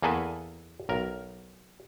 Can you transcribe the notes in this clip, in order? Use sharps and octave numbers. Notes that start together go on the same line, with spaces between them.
E2 A#3 G#4 A4 B4 G#5
B1 A#4